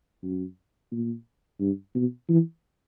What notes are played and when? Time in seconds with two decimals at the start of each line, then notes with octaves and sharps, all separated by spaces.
0.23 F#2
0.92 A#2
1.60 G2
1.95 B2
2.29 E3